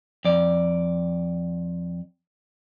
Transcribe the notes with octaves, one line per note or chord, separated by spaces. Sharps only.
F2 D5